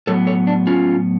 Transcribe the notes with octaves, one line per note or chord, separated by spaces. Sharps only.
A2 F#3 B3 A4 C#5
A4 C#5
D4
C#4 F4